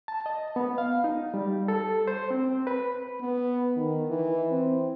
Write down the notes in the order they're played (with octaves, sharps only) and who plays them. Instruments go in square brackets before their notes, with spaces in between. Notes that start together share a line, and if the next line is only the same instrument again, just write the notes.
[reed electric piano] A5
D#5
B3
F5
D#4
G3
A4
C5
C4
B4
[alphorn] B3
D#3
E3
C4